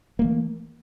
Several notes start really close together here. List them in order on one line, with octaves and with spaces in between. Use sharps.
A#3 A3 E3